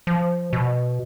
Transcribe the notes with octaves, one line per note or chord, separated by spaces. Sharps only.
F3
B2